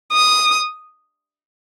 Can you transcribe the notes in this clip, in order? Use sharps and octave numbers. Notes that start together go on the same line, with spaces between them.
D#6